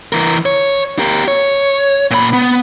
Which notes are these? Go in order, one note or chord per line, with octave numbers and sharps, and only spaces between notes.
E3 A#4
C#5
G4 A#4
C#5
A#2 B5
B3